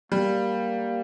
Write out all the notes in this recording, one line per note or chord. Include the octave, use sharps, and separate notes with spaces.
G3 A#3